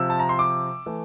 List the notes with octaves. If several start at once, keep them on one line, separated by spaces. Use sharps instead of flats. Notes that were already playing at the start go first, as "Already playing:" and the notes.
Already playing: C3 F3 C4 E6
A5
A#5
C6
D6
E3 A3